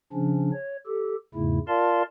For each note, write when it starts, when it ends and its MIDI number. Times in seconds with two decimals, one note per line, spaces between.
0.13 0.51 49
0.13 0.51 53
0.13 0.51 61
0.13 0.51 62
0.53 0.77 73
0.86 1.15 67
0.86 1.15 69
1.34 1.58 40
1.34 1.58 44
1.34 1.58 49
1.34 1.58 57
1.34 1.58 64
1.68 2.02 65
1.68 2.02 70
1.68 2.02 74
1.68 2.02 77
1.68 2.02 81
1.68 2.02 84